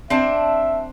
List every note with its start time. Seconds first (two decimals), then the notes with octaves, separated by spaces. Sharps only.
0.10 C4 D4 E5 A5